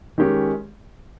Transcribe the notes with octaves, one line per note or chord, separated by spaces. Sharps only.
D#3 G#3 C#4 G4